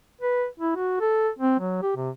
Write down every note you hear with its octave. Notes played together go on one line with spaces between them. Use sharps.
B4
E4
F#4
A4
C4
F#3
G4
C3